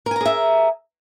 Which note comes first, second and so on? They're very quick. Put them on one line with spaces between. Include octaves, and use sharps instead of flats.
A#4 G#5 A#5 G#4 E5